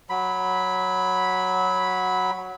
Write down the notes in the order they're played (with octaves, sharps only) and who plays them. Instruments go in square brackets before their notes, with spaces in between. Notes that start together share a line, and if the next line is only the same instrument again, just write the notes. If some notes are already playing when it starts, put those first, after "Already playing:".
[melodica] F#3 B5